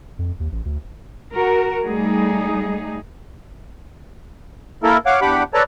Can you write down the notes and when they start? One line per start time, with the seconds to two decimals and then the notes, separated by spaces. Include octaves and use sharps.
0.19 F2
0.40 D#2
0.52 A1
0.65 D2
1.34 F#4 A#4
1.83 G3 A3 D#4 G#4
4.83 A#3 E4 A4 A#4
5.06 C#5 F5 F#5 D6
5.21 E2 D4 G4 F#5 B5 D6
5.54 A4 B4 C#5 D5 A5 A#5